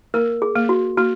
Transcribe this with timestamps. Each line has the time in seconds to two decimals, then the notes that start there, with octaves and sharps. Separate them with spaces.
0.14 A#3 A#4
0.42 G#4
0.56 A#3
0.69 F#4
0.97 A#3 F#4